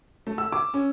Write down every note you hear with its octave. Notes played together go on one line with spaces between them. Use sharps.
A3
E6
D6
C#4